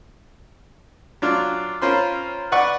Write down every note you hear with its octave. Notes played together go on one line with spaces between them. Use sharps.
F#3 D4 F4
C#4 F4 A#4 C5 B5 C6
B4 D5 F#5 C#6